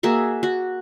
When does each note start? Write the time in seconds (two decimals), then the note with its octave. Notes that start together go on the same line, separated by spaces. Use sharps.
0.03 A#3 F#4 G#4 E5
0.43 F#4